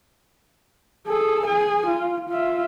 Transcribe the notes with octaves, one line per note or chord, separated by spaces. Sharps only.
G#4 A4
G#4 G#5
F4
F4 E5